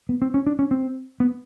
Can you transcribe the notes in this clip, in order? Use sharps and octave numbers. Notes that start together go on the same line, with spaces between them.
B3
C4
C#4
D4
C#4
C4
B3